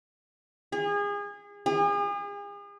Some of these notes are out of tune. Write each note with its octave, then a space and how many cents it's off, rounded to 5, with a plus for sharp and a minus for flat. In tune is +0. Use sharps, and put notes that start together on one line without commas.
G#4 -30
G#4 -40